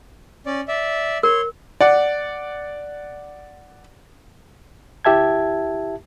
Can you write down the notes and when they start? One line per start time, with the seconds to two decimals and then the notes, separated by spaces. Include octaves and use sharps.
0.46 C#4 D5
0.68 D5 E5
1.23 A#4 C#5 C6
1.81 D5 F#5
5.05 D2 E4 G4 E5 A5 G#6